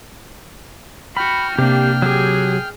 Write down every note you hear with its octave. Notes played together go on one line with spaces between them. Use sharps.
F#4 G5 B5 F6
C3 A#3 D4 G4
F#3 G4 G#4